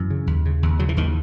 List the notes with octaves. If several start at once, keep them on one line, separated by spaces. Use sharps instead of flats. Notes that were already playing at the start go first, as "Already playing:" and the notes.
Already playing: F#2 E3
C#3
D#2
C#3
D#2
C#3 F#3
E3
D#2 D#3